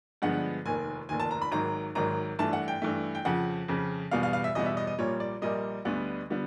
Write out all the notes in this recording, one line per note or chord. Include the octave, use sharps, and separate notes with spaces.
G2 D3 F3 G#3 B3 F#5
F1 D#2 D#3 G#5
F1 D#2 D#3 G#5
A5
A#5
B5
G#1 G#2 D#3 F#3 A#5
G#1 G#2 D#3 F#3 A#5
G2 E3 A3 A5
F#5
G5
G2 E3 A3
G5
F2 C#3 F3 F#5
F2 C#3 F3
E2 B2 G3 B3 F5
F5
F5
E5
E2 B2 G3 B3 D#5
E5
D#5
D#5
A#1 A#2 G3 A#3 C#5
D5
A#1 A#2 G3 A#3 D#5
D2 D3 G3 B3
D3 G3 B3